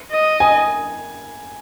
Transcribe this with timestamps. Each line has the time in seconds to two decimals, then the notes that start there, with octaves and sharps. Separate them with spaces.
0.12 D#5
0.40 G#5